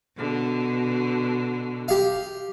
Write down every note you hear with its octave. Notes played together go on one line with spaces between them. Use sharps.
B2 D3
G4 F5